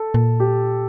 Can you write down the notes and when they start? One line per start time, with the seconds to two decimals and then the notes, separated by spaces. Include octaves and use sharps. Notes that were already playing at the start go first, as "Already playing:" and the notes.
Already playing: A4
0.14 A#2
0.40 G4